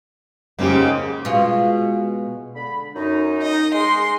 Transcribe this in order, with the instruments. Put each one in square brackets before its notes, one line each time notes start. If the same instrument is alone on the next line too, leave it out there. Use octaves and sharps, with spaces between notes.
[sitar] G#2 C#3 A#3 [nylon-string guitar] G#3 C#4 G4
[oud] B2 G#3 F4
[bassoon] D3 [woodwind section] B5
[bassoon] F#2 [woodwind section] D#4
[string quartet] D#5
[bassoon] G#3 [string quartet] C6